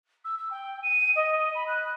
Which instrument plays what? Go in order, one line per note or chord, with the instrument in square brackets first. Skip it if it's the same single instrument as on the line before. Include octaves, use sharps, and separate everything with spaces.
[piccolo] E6
E6
G5
D#7
D#5
B5
F#6